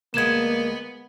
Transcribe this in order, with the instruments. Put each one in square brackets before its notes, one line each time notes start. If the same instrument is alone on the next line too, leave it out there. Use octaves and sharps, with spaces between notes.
[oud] D2 G#3 [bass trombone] A#3 [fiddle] B3 [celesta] G#6 E7